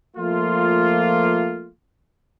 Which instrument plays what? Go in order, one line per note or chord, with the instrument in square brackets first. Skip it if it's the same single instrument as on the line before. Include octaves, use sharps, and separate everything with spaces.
[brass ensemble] F3 A3 A#3 F4